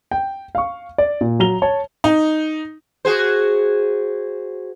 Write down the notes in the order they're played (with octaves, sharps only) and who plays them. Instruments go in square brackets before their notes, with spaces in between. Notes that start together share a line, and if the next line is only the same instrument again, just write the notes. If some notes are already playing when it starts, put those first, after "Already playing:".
[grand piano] G5
F5 C#6
D5
A#2
F#3 A#5 F7 G7
C#5 A5
[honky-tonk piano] D#4
[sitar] F#4 G#4 C5